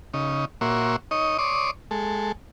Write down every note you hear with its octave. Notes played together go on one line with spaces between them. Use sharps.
C#3 D#4
A#2 A#3 F#4 C#5 E5 C6
D#4 C#5 D#5
C#5 D5 C6 D6 D#6
G#3 A4